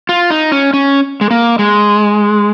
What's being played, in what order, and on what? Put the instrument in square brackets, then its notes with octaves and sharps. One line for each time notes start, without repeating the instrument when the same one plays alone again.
[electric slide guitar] F4
D#4
C#4
C#4
G#3
A#3
G#3